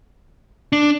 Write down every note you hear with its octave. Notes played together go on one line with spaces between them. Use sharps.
D4